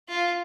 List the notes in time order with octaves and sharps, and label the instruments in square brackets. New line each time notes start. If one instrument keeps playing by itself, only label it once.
[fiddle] F4